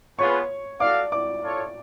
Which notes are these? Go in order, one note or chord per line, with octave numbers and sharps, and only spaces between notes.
B3 F4 G#4 B4 C#5 C#6
F#4 A4 D5 F5 D6
D5 D6
F4 A4 C#5